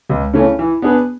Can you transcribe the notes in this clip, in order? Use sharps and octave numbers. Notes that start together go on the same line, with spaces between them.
C#2
C#3 E3 A3 C#4
E3
B3 D4 G#4 B4